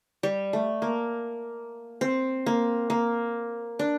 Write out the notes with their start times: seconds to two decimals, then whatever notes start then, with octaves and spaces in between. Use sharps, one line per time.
0.23 G3
0.53 A3
0.82 A#3
2.01 C4
2.46 A#3
2.90 A#3
3.79 D4